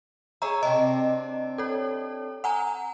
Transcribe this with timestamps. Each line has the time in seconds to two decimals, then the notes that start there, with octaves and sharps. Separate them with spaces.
0.42 G#4 C#5 E5 A#5
0.63 C3 C4 D4 D#5
1.58 A4 C#5
2.44 F#5 G#5 A#5